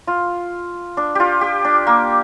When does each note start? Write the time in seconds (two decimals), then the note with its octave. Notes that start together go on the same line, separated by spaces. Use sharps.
0.07 F4
0.97 D4
1.15 F4 G4
1.41 G4
1.65 D4
1.87 A#3